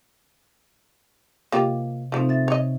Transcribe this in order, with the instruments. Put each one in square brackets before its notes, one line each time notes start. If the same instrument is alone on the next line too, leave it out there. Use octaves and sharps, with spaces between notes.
[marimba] C3 D#5 [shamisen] A#3 F4 G4
[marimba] C3 C4 D#4 [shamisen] F3 A3
[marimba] E5 A6
[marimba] C3 [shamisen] C#5 D#5